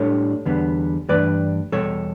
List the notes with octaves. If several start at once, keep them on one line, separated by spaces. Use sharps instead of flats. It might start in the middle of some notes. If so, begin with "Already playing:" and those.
Already playing: A2 G3 D4 A4 C#5
E2 D3 G3 B3
G2 E3 A3 D4 B4 D5
E2 B2 G3 A4 C#5